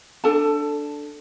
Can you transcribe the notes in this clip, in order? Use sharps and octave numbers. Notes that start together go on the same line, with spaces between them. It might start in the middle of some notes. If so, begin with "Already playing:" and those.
D4 A4 A5